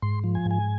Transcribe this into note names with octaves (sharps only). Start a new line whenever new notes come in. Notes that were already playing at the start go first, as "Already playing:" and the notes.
G#2 C6
F3
G#5
G#2
G#5